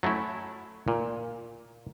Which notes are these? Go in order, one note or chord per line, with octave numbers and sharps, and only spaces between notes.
F#3 A3 C#4 E4
A#2